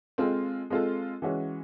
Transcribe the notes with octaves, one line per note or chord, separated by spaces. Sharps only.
G#3 C4 F4 A4
G#3 C4 F4 A4
E3 G#3 C#4 F#4